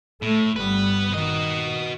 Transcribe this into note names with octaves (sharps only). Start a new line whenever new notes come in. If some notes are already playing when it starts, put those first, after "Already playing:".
A2 A3
G1 G3 B3 B4
D#3 F#4 D#5